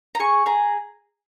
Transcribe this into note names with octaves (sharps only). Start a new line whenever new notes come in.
A#5
G#4 C#6
G#4 A#5